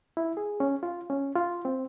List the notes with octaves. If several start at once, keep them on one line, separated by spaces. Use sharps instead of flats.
E4
G#4
C#4
F4
C#4
F4
C4